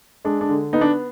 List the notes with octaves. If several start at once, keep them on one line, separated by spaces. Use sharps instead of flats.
G#3 D4
D4
D3
B3 D#4
D4